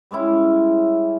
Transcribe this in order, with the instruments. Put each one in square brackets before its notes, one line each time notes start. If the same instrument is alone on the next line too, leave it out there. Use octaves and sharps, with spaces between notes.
[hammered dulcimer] G3 G#3 C#4 E4